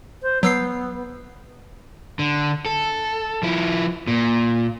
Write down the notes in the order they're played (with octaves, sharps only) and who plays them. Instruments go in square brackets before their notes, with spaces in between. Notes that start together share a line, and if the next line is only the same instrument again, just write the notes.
[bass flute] C5
[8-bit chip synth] F#3 E6 C7 [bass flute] B3
[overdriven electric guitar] D3
A4
F3 E4
A#2